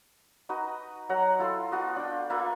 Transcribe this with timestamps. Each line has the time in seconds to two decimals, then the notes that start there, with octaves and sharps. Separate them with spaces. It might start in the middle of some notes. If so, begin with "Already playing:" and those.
0.49 D#4 F#4 B4 D#5
1.09 F#3 F#5 A#5
1.39 E4 F4 A4 C6
1.71 B3 F4 F#4 D#5
1.96 D4 G5
2.30 A#3 F4 B4 E5